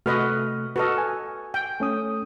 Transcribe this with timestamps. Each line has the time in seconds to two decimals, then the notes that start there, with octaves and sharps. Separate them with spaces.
0.06 C3 A3 F#4 B4 D#5 F6
0.76 F#4 A4 B4 D#5 F6
0.98 G#5
1.54 G5
1.80 A3 C#4 D#6